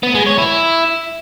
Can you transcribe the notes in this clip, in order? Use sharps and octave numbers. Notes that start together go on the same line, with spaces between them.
B3
G#3
C#5
E4